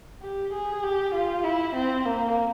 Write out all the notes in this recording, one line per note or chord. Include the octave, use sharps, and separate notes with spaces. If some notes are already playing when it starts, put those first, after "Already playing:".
G4
G#4
G4
F4
E4
C4
A#3